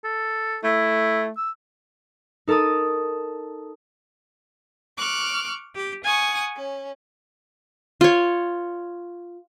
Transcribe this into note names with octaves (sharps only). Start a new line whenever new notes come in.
A4
A3 E4
E6
D#4 A4 A#4 A5 D#6
C#6 D6 F6 F#6
G4
F#5 G#5 C#6 D#6
C#4
F4 C#5